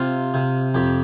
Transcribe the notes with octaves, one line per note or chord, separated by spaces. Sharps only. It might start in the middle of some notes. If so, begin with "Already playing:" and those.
Already playing: C3 F4
C3
F2 G4